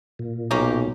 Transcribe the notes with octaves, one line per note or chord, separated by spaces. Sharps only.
A#2
B1 A#3 C#4 G4